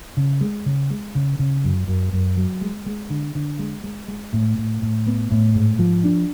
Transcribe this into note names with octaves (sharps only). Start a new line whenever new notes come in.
C#3
G#3
C#3
G#3
C#3
C#3
F#2
F#2
F#2
F#3
G#3
G#3
D3
D3
G#3
G#3
G#3
A2
A2
A2
B3
A2
G#2
F3
D4